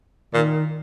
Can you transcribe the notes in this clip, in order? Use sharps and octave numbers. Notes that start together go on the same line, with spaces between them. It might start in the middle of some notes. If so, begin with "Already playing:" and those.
A#2 D#3